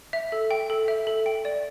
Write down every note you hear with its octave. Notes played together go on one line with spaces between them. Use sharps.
E5
A4
G5
A4
E5
A4
G5
D5